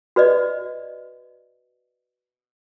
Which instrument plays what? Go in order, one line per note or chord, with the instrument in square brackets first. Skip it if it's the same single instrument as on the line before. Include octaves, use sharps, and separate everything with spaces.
[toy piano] F#4 B4 D5 D#5